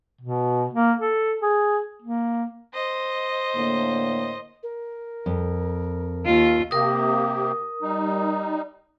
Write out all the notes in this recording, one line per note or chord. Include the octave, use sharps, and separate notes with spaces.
B2
A#3
A4
G#4
A#3
C5 D#5
A2 D3 A#3
A#4
F2
D#2 F4
C3 A#3 G4 A#4 D#6
G3 D#4